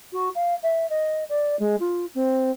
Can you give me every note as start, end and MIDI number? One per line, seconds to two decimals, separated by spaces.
0.13 0.29 66
0.35 0.55 77
0.63 0.89 76
0.90 1.24 75
1.29 1.58 74
1.59 1.76 56
1.80 2.06 65
2.15 2.51 60